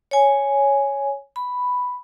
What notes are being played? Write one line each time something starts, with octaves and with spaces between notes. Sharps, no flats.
C#5 G#5
B5